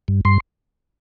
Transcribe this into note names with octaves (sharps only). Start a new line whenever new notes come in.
G2
G2 C6